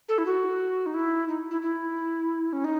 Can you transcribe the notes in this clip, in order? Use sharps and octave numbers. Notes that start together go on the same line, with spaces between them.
A4
E4
F#4
D#4
E4
D#4
E4
E4
C#4
D#4